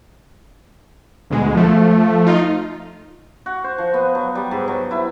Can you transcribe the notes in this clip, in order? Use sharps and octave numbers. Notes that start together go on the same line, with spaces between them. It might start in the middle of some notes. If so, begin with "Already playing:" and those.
D2 B2 G#3
F3 A3
D#4 F4
F#4
C5
F3
B3
F#3
G3
G#2
F#3
E4